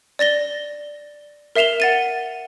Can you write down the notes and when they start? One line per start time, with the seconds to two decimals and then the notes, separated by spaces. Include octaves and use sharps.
0.19 D5 A6 A#6 G7
1.56 A#4 E5 C7 E7 F7 G7
1.80 F#5 A6 D#7